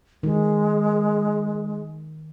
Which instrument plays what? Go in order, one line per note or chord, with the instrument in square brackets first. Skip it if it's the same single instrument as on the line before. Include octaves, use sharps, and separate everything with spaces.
[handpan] D#3 [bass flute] G#3